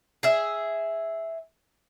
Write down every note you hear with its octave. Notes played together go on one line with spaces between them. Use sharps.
G#4 E5